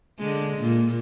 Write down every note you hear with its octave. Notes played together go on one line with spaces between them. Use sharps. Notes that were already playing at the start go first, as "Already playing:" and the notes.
D3 G#3
A#2